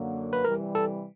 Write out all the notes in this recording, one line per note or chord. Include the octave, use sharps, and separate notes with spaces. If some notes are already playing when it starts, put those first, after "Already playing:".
Already playing: F#2 D3 F#3 A#3
B4
C3 E3 G3 A#4
A4